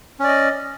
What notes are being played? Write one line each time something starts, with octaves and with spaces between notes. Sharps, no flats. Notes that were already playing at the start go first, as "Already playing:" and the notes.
C#4 D5 D#5